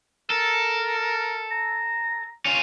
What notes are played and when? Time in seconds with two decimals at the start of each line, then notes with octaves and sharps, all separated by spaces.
0.30 A4 A#4
1.51 A#5
2.45 C#4 F4